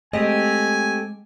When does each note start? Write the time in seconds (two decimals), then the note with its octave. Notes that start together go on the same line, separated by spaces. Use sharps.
0.13 G#3 A3 C4 G4 D#5 G#5